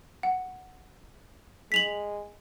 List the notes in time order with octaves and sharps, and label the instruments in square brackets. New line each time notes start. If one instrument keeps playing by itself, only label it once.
[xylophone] F#5
[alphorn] G#3 [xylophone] B6 F7 F#7